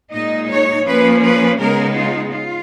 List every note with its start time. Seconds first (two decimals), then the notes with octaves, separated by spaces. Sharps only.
0.12 A#2 G#3 D#4 D#5
0.49 C#5
0.85 F3 A#3 C#4 B4
1.22 B4
1.59 C#3 G#3 B3 D#4 A#4
1.95 F4
2.32 F4